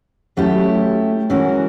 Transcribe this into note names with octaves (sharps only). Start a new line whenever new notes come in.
F#3 A3 C#4 E4 G4
E3 G#3 C#4 F#4 A#4